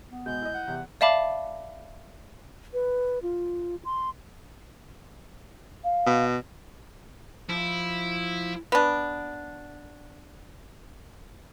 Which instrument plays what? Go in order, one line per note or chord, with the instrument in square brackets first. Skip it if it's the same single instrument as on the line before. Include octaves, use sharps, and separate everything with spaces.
[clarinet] B3
[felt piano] B2 [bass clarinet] G#3 [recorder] G6
[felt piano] E4 D#5
[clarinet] F#5
[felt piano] E2 [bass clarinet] C3
[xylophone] D5 E5 F5 A5 B5 D6
[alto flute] B4
F4
C6
[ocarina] F5
[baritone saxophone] B2
[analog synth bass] F3 [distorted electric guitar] E4
[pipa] B3 D4